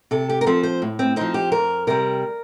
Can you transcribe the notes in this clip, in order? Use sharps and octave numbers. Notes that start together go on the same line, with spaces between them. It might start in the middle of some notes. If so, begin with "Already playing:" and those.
C3 A4
G4
A#4
F3 C4 A4
C5
A2
C4
F3 C4 D#4
G4
F2 A#4
C3 G3 A#4